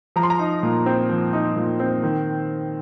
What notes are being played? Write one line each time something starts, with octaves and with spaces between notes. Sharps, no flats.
F3 A#5
C6
A#5
D#4
A#2
C4
F3
D#4
A#2
C4
D#3